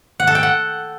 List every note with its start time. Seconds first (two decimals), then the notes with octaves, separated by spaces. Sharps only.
0.20 F#5
0.27 A4
0.35 G5
0.43 F#5